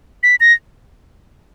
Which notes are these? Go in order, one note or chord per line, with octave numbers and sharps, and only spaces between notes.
B6
A#6